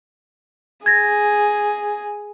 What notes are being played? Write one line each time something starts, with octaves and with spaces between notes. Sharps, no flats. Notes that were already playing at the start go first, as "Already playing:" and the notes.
G#4 G#6 A#6